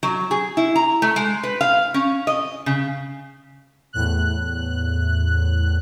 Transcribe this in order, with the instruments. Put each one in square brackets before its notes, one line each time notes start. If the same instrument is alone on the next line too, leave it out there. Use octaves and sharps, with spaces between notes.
[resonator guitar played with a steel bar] F#3
G#4
E4
A#5
A3
G#3
B4
F5
C#4
D#5
C#3
[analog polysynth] E2 A2 F#6